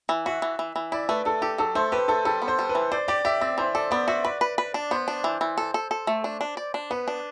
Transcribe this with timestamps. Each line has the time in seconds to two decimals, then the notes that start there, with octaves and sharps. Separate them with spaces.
0.09 E3
0.26 F#4 E5
0.42 E3
0.59 E3
0.76 E3
0.92 E4 D5
1.09 A3 B4
1.25 A3 A4
1.42 G4 A4
1.58 F#3 A4
1.75 A3 C5
1.92 G4 B4
2.08 A3 A4
2.25 G3 A4
2.42 B3
2.48 C5
2.59 G3
2.69 B4
2.75 E3
2.91 C5 D5
3.08 G4 D5
3.25 G4 E5
3.41 C4 D5
3.58 E3 C5
3.75 A4 D5
3.91 B3 D5
4.08 F#4 E5
4.25 B4 D5
4.41 B4
4.58 B4
4.74 D4
4.91 B3 C5
5.08 D4
5.24 E3
5.41 E3
5.58 A4
5.74 A4
5.91 A4
6.07 A3
6.24 D4
6.41 D4
6.57 D5
6.74 D4
6.90 B3 B4
7.08 D4